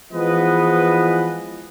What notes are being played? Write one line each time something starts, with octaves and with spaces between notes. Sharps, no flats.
E3 F3 G#3 B3 B4 D#5